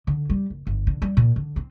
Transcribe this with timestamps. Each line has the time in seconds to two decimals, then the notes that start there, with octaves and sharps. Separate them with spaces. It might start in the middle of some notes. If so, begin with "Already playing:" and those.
0.07 D3
0.30 G3
0.50 F#1
0.67 G1
0.87 D3
1.02 G3
1.17 A#2
1.36 D3
1.56 C4